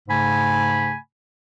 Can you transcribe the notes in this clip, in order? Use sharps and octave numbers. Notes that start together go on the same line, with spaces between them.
G#2 C#3 A3 G#5 B5